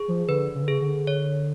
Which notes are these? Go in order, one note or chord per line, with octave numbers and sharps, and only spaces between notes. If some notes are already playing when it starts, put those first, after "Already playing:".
Already playing: G#4
F3
D3 B4
C#3
D3
C#3 G#4
D3
C#5